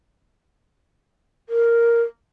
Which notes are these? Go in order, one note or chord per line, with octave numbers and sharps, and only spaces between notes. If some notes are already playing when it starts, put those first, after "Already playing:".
A#4